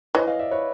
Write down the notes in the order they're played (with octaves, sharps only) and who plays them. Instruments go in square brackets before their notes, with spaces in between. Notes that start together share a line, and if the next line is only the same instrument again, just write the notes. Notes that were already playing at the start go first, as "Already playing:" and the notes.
[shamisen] E3 [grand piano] C#5 D#5
[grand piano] D#5 F5
D5 E5
B4 C#5